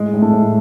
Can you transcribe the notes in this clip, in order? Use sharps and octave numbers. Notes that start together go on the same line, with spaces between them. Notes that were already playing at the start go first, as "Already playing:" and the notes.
Already playing: A2 G#3
A2
A3
A2